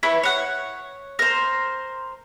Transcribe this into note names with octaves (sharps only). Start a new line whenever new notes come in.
E4 B4 C#5 G#5
C#5 F#5
A#4 C5